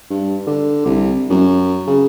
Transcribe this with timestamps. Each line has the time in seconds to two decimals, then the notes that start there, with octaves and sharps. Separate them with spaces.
0.10 G2
0.47 D3
0.85 C2
1.30 F#2
1.87 C#3